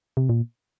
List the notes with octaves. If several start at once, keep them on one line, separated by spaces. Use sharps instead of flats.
C3
A#2